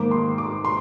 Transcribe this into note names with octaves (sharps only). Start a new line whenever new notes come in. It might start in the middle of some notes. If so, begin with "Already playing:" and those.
Already playing: G#2 D#3 A#3 D6
C6
D6
C6